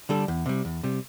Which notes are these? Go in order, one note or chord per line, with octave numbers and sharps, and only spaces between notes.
D3 G3 D4 A4
E2
C3 G3
E2
C3 G3